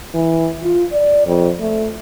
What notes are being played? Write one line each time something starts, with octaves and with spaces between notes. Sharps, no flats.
E3
F4
D5
F2
A3